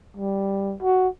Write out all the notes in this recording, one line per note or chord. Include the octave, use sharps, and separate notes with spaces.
G3
F#4